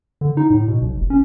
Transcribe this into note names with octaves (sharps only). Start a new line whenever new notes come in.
D3
D#4
A2
B2
B1
F1
C#4